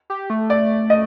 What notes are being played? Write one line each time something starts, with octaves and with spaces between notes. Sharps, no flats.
G4
A3
D5
D#5